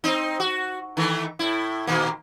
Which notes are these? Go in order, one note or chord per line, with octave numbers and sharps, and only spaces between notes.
C4 D#4
F#4
D#3 E3 A3
A2 E4
A#2 D#3 A#3